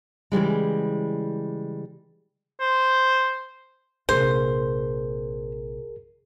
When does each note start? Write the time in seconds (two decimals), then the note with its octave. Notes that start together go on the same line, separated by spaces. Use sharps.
0.32 C#3 E3 G3 G#3
2.61 C5
4.09 A#1 C3 G#4 A#4 C5